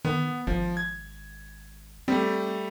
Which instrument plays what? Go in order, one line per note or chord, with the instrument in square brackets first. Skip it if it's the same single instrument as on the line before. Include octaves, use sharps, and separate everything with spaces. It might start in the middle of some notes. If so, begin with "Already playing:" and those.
[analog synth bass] D#3 [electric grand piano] B3
[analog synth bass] G#1 [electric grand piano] F3
[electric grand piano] G#6
[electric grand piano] G3 A3 [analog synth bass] C4